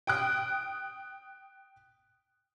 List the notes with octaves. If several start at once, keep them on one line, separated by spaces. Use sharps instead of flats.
G5 D#6 F#6